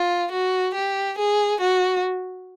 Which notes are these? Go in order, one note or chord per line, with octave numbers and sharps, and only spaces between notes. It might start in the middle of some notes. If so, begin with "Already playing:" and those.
Already playing: F4
F#4
G4
G#4
F#4